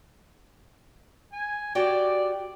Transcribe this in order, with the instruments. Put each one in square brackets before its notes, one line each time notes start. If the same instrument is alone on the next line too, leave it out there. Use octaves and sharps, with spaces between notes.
[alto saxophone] G#5
[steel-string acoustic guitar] F#4 G4 G5 [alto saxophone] D5